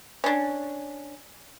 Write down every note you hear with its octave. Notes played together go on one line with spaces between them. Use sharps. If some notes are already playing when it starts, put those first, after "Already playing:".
C#4 D4